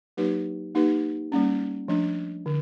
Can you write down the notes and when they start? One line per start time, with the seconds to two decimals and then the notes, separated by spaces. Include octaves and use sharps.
0.17 F#3 A#3 D#4 G4 B4
0.75 A#3 D#4 G4 B4
1.32 G3 A#3 C#4
1.88 F3 A3 D4
2.46 D3